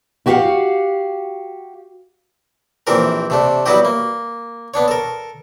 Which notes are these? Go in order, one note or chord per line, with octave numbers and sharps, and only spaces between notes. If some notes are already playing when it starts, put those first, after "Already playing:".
E4 F#4 G4 A#4 F5 F#5
A#1 E3 C4 G4 A#4
C3 A3 D4
F#3 G3 B3 E4 F#4 G4
A#3
B3 D4 C#5
A4 A#4